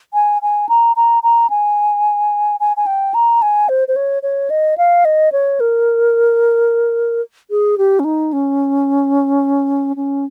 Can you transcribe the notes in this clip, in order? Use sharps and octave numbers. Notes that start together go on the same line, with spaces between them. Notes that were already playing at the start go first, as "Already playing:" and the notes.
G#5
G#5
A#5
A#5
A#5
G#5
G#5
G#5
G5
A#5
G#5
C5
C5
C#5
C#5
D#5
F5
D#5
C#5
A#4
G#4
G4
C#4
D#4
C#4
C#4